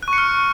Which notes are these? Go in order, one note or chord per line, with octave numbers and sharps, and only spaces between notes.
F#6
C#6
C#7
F6